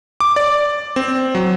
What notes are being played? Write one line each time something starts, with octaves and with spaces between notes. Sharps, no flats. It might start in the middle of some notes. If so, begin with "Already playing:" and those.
D6
D5
C4
F#3